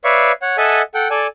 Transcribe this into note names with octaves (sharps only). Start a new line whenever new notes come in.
B4 C#5 D5 E5 F5 C#6
C#5 F#5
A4 D#5 E5 F#5 G#5 A5
A4 F#5 G5
A4 D5 G#5 A5